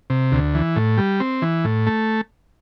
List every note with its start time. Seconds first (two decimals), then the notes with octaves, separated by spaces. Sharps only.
0.10 C3
0.32 D2
0.55 E3
0.76 A2
0.98 G3
1.20 C4
1.42 E3
1.65 A2
1.87 A3